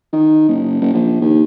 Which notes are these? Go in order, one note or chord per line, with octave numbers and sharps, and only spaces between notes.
D#3
F#1
F#1
A#1
D#2